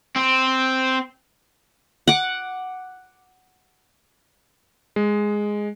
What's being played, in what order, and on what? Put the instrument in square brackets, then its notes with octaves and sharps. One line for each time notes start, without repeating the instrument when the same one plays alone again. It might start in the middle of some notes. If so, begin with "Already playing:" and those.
[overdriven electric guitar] C4
[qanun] F#5 D6
[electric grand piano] G#3